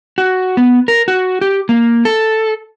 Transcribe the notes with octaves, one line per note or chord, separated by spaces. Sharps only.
F#4
B3
A#4
F#4
G4
A#3
A4